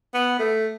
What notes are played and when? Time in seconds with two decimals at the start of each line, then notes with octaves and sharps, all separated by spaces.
0.14 B3
0.39 A3